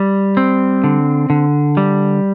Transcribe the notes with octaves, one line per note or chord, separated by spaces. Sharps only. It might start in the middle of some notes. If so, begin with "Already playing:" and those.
Already playing: G3
C4
D3
D3
G3